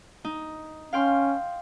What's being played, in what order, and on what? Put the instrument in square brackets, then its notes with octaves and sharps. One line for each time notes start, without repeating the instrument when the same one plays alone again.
[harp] D#4
[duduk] C#4 [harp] F5 G5 C6